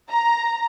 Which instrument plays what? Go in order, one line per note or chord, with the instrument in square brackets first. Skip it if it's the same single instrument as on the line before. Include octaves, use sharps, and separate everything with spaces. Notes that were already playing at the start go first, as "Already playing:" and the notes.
[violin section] A#5